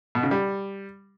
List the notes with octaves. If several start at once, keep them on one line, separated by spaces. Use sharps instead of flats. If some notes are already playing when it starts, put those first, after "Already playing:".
B2
C#3
G3